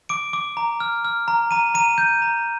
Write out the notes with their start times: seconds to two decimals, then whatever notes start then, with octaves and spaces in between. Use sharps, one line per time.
0.09 D6 D7
0.33 D6
0.57 A#5
0.80 F6
1.05 F6
1.28 A#5
1.51 A#5 D#7
1.74 A#5 D#7
1.98 G6 D#7
2.22 A#5